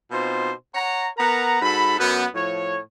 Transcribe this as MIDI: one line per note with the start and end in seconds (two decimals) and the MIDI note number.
0.12 0.52 47
0.12 0.52 60
0.12 0.52 63
0.12 0.52 65
0.12 0.52 72
0.75 1.07 73
0.75 1.07 78
0.75 1.07 82
1.17 1.58 59
1.17 1.58 70
1.17 1.58 78
1.17 1.58 82
1.62 1.99 44
1.62 1.99 66
1.62 1.99 69
1.62 1.99 83
1.99 2.27 42
1.99 2.27 59
2.35 2.80 45
2.35 2.80 53
2.35 2.80 73